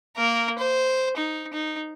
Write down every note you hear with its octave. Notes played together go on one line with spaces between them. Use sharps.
A#3 A#4
C5
D#4
D#4